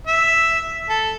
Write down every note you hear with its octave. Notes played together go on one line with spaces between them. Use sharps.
E5
A4